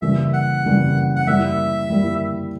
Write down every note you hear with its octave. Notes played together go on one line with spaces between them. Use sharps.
C#3 E3 G3 A#3 C#4 E5
F#5
C#3 E3 G3 A#3 C#4
F#5
G3 A#3 E4 E5
G3 A#3 E4